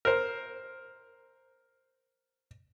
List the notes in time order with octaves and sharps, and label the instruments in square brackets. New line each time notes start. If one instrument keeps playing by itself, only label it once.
[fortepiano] A#4 C5